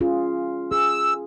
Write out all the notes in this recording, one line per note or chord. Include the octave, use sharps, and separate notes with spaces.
C#4 F4 G#4
G#4 E6